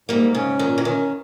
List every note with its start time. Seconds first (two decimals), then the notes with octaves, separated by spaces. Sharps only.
0.09 G#2 G3 A#3
0.35 C#3 C#4
0.59 A#2 D#3
0.78 E3
0.85 D#3 C#4